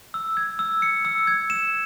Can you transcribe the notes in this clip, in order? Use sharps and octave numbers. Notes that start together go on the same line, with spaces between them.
E6
G#6
E6
C#7
E6
G#6
E7